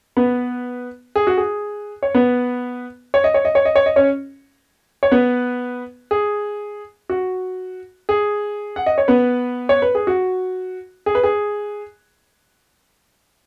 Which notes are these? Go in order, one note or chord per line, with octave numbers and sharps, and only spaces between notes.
B3 B4
G#4
F#4
G#4
C#5
B3 B4
C#5
D#5
C#5
D#5
C#5
D#5
C#5
D#5
C#4 C#5
C#5
B3 B4
G#4
F#4
G#4
F#5
D#5
C#5
B3 B4
C#5
B4
G#4
F#4
G#4
B4
G#4